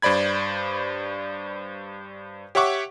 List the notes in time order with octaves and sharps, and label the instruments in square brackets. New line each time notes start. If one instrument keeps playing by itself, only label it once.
[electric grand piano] G2 C5 D5 B5 G#6
G4 C#5 E5 F#5 C#6 D6